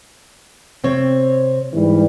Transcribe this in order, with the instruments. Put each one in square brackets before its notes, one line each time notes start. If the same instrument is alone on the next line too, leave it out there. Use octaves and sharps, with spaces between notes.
[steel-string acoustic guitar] C3 C4 C#5
[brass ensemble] G#2 E3 G3